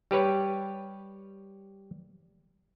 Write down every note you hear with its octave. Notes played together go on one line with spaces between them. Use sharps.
G3 G4 B4 C#5